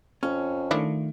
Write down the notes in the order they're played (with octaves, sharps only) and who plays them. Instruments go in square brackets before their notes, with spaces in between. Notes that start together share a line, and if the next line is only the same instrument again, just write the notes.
[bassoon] F2 [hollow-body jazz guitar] C#4
[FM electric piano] D#3 A3 [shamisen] F3 D4 E4